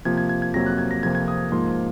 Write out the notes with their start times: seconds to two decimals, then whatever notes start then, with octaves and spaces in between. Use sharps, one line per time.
0.05 C3 F3 A#3 G#6
0.18 G#6
0.29 G#6
0.42 G#6
0.54 F2 C3 F#3 A#3 A#6
0.66 F#6
0.78 G#6
0.91 A#6
1.03 F2 C3 F3 A#3 G#6
1.15 G#6
1.28 D#6
1.52 G#2 F3 A#3 C6